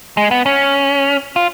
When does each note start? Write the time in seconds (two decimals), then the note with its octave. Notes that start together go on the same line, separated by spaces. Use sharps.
0.17 G#3
0.31 B3
0.46 C#4
1.36 F4